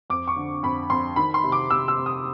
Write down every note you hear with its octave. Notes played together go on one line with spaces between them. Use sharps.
F2 D6
C#6
D3
F2 B5
F2 C6
D#3 B5
C6
C3
D6
C3 E6
E6
C3
D#6